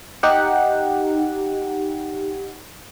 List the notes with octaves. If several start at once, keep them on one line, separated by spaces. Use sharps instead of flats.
D#4 G4 F#5